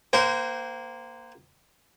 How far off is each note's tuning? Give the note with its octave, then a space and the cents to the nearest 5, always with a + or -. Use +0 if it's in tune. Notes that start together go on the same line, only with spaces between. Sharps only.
A#3 +0 C5 -25 G5 -35